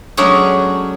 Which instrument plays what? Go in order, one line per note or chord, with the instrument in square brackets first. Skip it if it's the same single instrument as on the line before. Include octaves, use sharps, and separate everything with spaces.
[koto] F#3 G#3 A3 C#4 D4 G#4